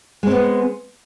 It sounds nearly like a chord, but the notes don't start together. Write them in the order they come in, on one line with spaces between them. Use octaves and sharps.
G#3 C4 B3